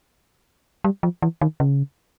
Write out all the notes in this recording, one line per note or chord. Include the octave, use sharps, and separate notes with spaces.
G3
F3
E3
D#3
C#3